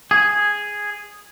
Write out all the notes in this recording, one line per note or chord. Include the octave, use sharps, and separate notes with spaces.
G#4